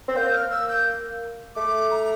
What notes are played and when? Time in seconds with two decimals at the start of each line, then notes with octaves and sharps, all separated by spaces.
0.08 C4
0.16 A#3 G6
0.34 F6
0.51 E6
0.69 G6
1.55 A3 D6
1.91 A#5